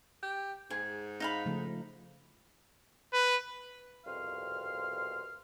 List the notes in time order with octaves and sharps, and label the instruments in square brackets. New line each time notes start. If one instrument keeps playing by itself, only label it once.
[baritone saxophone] G4
[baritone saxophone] G#2 [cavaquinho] G#4
[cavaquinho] D#4 F5 B5
[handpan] C#3 F3 A3
[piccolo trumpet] B4
[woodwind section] C2 F2 B2 F5 C6 F6